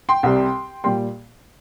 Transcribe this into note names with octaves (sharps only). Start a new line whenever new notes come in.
G5 C6
C2 C3 G3
A#2 G3 G5 C6